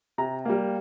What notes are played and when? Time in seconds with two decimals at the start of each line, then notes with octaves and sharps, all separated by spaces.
0.18 C3 A#5
0.45 G3 A#3